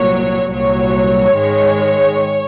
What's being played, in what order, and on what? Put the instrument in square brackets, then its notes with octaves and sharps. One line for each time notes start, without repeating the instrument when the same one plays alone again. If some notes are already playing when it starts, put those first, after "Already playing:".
Already playing: [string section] C2 A#2 F#3 C#5
C2 A#2 F#3 C#5
G#2 D#3 G#3